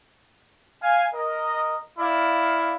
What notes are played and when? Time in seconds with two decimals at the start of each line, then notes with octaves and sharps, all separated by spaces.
0.83 F5 G#5
1.14 A#4 D#5
1.99 E4 D5 F5